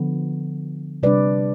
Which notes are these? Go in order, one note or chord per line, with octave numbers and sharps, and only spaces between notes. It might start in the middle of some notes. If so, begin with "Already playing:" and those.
Already playing: D3 F3 B3
C3 G3 D4 B4 D5